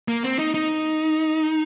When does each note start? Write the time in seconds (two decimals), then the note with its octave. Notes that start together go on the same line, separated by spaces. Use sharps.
0.08 A#3
0.24 C4
0.39 D#4
0.54 D#4